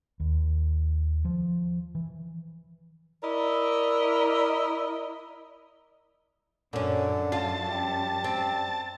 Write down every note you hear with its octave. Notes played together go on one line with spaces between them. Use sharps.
D#2
F3
E3
E4 A#4 D5 D#5
F#2 A#2 D3 C#4
F4 A5
G3
C4